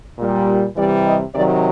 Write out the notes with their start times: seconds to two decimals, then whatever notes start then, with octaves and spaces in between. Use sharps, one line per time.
0.19 A#2 G3
0.77 C3 E3 G3 D5
1.06 D#5
1.34 C3 D#3 F#3 D5